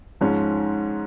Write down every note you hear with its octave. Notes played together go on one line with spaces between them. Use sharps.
G#2 F3 G#3 C#4